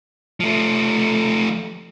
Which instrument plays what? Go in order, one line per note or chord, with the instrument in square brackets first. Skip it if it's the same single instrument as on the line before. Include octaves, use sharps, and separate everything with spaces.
[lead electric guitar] F3 A3